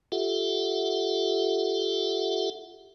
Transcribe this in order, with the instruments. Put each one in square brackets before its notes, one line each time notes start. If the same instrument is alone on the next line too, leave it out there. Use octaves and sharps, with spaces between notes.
[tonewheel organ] F4 G4 A4 E5 F#5